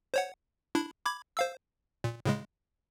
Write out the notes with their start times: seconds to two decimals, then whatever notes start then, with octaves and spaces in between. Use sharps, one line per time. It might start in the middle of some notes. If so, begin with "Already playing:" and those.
0.14 C5 C#5 F#5
0.75 D4 E4 B5
1.05 B5 D6 G#6
1.37 C5 F5 E6
2.04 A#2
2.25 A2 C#3 G#3